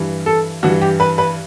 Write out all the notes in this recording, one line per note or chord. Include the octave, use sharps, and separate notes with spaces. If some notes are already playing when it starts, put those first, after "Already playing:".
Already playing: G2 E3
A4
G2 E3 F#4
G4
B4
B4